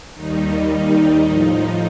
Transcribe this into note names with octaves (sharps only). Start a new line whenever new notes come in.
D#2 D#3 G3 D#4
D#4
A2 F3 D#4